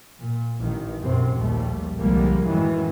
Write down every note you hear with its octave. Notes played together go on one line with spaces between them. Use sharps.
A#2
A1 D#3
B1 F#2 C3 C4
A#1 D#2 G3 A3
C2 D3 F3 G3 G#3 A#3
F#2 A2 D#3 E3 F#3 G#3